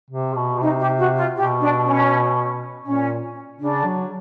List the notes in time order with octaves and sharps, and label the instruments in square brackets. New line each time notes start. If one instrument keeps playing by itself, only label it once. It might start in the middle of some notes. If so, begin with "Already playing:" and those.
[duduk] C3
B2
[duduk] C3 [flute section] D#4
[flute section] G4
F#4
F4
[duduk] B2 [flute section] G4
[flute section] D4
C#4
[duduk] A#2 [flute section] C#4
[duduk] C#3 [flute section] D4
[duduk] F#3